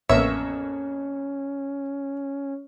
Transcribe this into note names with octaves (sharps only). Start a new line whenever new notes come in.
A1 F2 A#3 B3 C#4 C#5 E5 E6